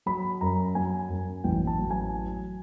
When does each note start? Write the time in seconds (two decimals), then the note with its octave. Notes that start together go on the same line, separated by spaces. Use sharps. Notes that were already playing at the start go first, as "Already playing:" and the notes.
0.06 F#3 B5
0.41 F#2 A#5
0.75 F#3 G#5
1.09 F#2
1.44 A1 G5
1.67 A5
1.79 F#3
1.91 G#5